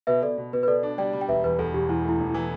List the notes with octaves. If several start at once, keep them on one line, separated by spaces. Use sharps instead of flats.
B2 B4 E5
B2 A4 D5
B2
B2 B4
B4
B2 A4 D5
D4
G3 D5 G5
G3
G5
E1 B4 E5
E2 B4
E2 A4
E1 G4
E2 E4
A3 E4
E1
E4
E3